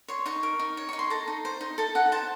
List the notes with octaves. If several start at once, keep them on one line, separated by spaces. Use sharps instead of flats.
C#5 C6
D#4 C#6
A#4
D#4
C#5
D#4 C#6
C6
A4 A#5
D#4
C5
D#4
A4 A5
D#4 F#5
C5 A5